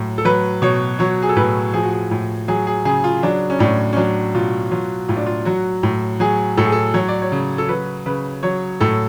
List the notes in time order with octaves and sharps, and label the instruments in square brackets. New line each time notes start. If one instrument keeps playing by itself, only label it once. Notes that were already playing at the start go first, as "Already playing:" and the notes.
Already playing: [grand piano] A2 F#3
A4
F#3 B4
B2 C#5
F#3 C#5
G#4
A4
A2 B4
F3 G#4
F#4
G#4
A2
F#3 G#4
G#4
C#3 G#4
F4
F#3 D4
C#4
A2 D4
C#4
F#3 D4
B2 F4
F#3 F4
A2 F4
D4
F4
F#3 F#4
A2
F#3 G#4
A2 A4
G#4
A4
F#3 C#5
D5
C#5
C#3
A4
F#3 B4
C#3 B4
F#3 C#5
A2 A4